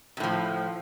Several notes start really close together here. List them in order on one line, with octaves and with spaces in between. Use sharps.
C3 A2 F3